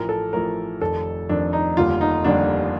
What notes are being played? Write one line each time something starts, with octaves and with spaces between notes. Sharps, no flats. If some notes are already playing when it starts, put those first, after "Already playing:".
Already playing: A1 A2 F3 A#4
A4
A1 A2 F3 A#4
F1 F2 D#3 A4
F1 F2 D#3 D4
D#4
F1 D#2 D3 G3 F4
D#4
F1 D#2 D3 G3 D4